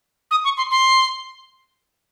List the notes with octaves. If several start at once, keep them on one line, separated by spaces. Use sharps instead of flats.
D#6
C#6
C6
C6